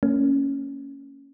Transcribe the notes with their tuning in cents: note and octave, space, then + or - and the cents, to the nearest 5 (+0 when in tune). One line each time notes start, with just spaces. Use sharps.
A#3 -25 C#4 +0